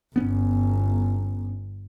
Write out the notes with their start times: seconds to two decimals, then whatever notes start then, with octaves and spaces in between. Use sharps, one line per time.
0.16 G1 B3 C#4